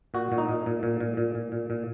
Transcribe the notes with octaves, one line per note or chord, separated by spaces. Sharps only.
A#2 F#4
A#2
D#4
A#2
A#2
A#2
A#2
A#2
A#2
A#2
A#2